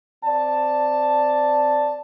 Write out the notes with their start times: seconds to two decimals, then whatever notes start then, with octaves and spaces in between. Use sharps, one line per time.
0.24 C4 D5 A5